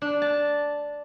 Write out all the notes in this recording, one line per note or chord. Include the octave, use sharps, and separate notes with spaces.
D4
A5